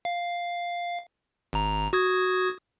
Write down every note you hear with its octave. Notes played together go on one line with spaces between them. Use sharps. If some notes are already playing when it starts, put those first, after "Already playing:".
F5
G#1 A#5
F#4 D#6 G#6